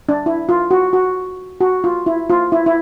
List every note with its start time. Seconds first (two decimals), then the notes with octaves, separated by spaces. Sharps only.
0.09 D4
0.26 E4
0.49 F4
0.71 F#4
0.93 F#4
1.61 F#4
1.84 F4
2.06 E4
2.30 F4
2.52 E4
2.66 E4